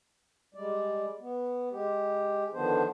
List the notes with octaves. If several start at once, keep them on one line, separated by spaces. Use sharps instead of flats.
G3 G#3 D5
B3
G#3 G4
D3 D#3 F3 B3 D4 C5